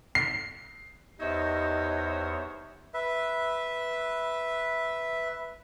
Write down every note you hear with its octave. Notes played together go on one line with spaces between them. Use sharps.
C7
E2 D#4 G4 C5 C#5 D#5 E5
B4 E5